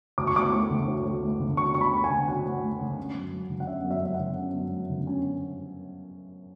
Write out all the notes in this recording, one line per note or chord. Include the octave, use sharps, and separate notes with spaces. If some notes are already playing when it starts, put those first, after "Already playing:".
D2 D6
C#6
D2 D6
A3
D3
D2
D2
A3
D3
D2 C#6
D2 C#6
B5
A3
G#5
D3
D2 F#5
D2
A3
D3
C#4
F#2
F#3
D3
F#5
C#4 E5
F#2
E5
F#3 E5
F#5
D3
C#4
F#2
F#3
D3
C#4